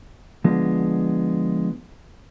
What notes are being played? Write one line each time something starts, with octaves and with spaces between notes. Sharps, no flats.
D3 F3 G#3 B3